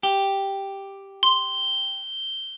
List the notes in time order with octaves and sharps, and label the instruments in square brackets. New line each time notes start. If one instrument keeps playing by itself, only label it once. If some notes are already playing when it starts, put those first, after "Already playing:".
[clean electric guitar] G4 [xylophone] G7
[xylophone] C6 [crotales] G7